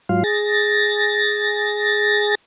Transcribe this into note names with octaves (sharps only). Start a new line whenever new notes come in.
G#2 F#3 F4 F5
G#4 A6 A#6